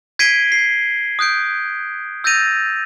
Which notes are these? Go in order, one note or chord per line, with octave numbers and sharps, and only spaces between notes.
G#6 B6 C7 D7 D#7 G7
C7
D#6 F#6 G6 D7
E6 G6 A6 A#6 D#7 F7